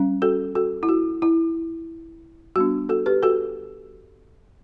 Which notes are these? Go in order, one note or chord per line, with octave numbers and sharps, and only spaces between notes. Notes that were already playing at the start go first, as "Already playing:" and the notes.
Already playing: G3 C#4
F#4 A4
F#4 A4
E4
F#4
E4
G3 B3 D4 F#4
F#4 A4
G4 B4
F#4 A4